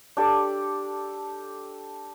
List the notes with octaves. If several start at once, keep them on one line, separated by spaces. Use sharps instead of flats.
D4 G4 A4 D5